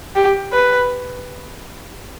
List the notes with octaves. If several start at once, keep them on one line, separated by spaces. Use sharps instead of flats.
G4
B4